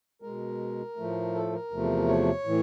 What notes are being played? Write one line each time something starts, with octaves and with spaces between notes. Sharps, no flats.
B2 G#3 A#4
A2 F3 A3
A4
A#4
E2 C3 F3 A3
C#5
A2 E3